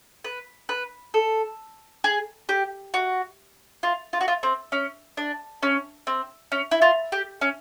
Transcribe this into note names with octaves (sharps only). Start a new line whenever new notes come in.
B4
B4
A4
G#4
G4
F#4
F4
F4
F#4
F4
C4
C#4
D4
C#4
C4
C#4
E4
F4
G4
C#4